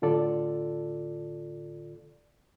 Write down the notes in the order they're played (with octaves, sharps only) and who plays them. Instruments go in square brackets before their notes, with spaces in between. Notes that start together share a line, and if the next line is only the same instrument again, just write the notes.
[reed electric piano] A2 D3 F4 A4 D5